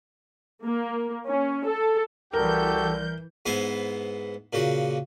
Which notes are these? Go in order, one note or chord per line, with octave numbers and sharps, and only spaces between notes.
A#3
C#4
A4
C2 E3 F#4 G4 A4 A#4 G6
G#2 B3 E4 C5 G#5
A#2 C#3 F#4